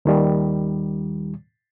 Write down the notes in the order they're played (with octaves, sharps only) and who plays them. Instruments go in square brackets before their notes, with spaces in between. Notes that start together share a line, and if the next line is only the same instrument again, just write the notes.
[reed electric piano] D#2 D#3 G3